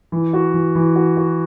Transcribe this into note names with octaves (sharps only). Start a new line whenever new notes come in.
E3
F#4
E3
E3
F#4
F#4